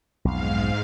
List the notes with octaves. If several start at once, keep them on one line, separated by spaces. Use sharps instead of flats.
B1 F2 G#2 F5